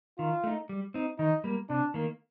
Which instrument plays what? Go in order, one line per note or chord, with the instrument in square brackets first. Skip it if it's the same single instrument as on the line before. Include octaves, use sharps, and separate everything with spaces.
[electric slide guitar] D#3 [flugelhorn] F4
[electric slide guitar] A3 D#4
G3
C4 D#4
[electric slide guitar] D#3 [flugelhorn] D#4
[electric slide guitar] G3 A#3
[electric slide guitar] C3 [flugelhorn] D4
[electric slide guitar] D#3 A#3